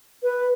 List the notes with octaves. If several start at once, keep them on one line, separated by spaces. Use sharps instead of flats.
B4